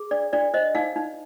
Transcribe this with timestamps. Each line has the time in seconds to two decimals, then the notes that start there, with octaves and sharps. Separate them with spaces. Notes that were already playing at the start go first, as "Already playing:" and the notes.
Already playing: G#4
0.11 D4 D5
0.33 D4 D5
0.54 C5 D#5
0.75 D#4 F5
0.96 D#4